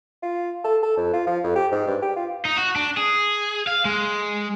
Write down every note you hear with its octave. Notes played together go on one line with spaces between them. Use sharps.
F4
A4
A4
F2
F4
F3
F2
G4
G#2
G2
G4
F4
D#4
F#4
D4
G#4
F5
G#3